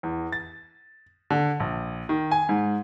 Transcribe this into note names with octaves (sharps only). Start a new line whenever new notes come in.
E2
A6
D3
A#1
D#3
G#5
G#2